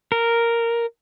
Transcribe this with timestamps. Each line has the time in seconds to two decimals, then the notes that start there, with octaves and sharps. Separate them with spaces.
0.12 A#4